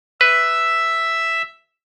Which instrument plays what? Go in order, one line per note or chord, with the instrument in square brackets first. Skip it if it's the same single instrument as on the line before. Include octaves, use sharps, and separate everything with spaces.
[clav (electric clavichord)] B4 [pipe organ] E5